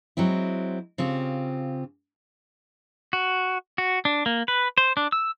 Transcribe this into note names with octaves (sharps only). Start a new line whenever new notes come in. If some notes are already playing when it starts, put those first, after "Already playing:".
F#3 G#3 C4 E4
C#3 C4 F4 G4
F#4
F#4
D4
A#3
B4
C5
D4
E6